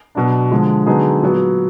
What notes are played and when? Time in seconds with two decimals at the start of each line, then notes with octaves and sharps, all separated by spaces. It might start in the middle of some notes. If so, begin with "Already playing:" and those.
0.15 B2 F#3 B3 D4
0.51 D3 F3 G#3
0.86 D3 F#3 B3 D#4 G#4
1.22 A#2 F#3 B3